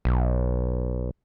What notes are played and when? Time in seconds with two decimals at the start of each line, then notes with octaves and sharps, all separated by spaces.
0.05 B1